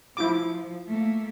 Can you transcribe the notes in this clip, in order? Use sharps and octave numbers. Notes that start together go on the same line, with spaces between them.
F3 E4 F4 D6
A3 A#3